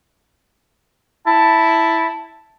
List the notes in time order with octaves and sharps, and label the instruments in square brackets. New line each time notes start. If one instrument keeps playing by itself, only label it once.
[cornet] E4 [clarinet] A5